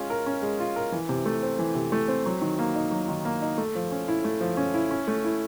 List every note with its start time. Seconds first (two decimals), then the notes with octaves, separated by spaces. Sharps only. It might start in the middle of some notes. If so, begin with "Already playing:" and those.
Already playing: G#3 C#4 F4
0.10 A#4
0.26 C#4
0.42 G#3
0.59 F4
0.76 A#4
0.92 E3
1.09 C3
1.26 A3
1.43 C4
1.59 E3
1.75 C3
1.92 A3
2.08 C4
2.26 F#3
2.42 D#3
2.59 A#3
2.75 D#4
2.91 F#3
3.08 D#3
3.25 A#3
3.42 D#4
3.58 A3
3.75 F3
3.91 C#4
4.08 E4
4.24 A3
4.41 F3
4.57 C#4
4.74 E4
4.91 C#4
5.08 A3
5.24 E4